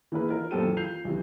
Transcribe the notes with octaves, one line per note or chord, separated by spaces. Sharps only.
E3 A#3 E4 G#4 A#4 B4
D#4 F4 A#4
F#2 A#2 G4 A4 C5 D#7
E3
F4 G6 C7 F7
B1 C3 E3